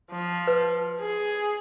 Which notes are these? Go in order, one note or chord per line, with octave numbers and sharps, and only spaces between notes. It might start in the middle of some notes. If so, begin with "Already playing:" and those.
F3
B4
G#4